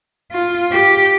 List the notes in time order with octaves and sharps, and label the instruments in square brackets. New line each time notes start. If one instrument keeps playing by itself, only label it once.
[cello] F4
G4